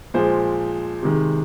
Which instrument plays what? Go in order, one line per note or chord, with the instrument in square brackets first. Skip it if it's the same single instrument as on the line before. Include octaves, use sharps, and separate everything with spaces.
[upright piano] A#2 F3 G#3 C5
C3 D#3 G#3